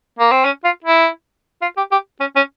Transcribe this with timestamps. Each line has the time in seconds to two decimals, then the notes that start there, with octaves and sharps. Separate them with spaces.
0.19 A#3
0.31 C4
0.45 C#4
0.64 F4
0.84 E4
1.62 F4
1.77 G4
1.92 G4
2.20 C#4
2.36 C#4